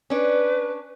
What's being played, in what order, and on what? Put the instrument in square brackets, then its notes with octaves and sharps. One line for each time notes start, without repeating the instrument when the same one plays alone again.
[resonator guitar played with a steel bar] C#4 D4 [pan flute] B4